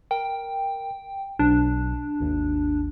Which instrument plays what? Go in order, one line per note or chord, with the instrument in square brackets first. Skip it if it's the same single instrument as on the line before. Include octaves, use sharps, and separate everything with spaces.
[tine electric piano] A#4 [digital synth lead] G5
[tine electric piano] B1 [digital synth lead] D4
[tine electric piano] G#1 D#2